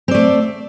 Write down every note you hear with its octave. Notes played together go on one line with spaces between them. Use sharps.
A3 C4 D5